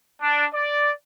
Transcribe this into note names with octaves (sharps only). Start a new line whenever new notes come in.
D4
D5